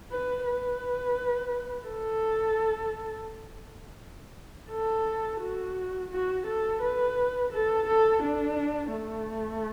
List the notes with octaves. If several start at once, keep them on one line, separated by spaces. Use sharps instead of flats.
B4
B4
A4
A4
F#4
F#4
A4
B4
A4
A4
D4
A3